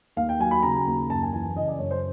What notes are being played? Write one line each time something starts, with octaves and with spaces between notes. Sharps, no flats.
D#2 F5
G5
F#3 G#5
B5
C#3 A#5
D#2
F#2 A5
G#5
E3 G#5
C#3 D#5
D5
F#2 C#5
C5